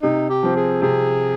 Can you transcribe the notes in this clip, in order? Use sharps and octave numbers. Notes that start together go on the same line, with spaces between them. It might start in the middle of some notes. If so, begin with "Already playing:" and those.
C3 D#4
G4
F3 C4
G#4
C3 G#4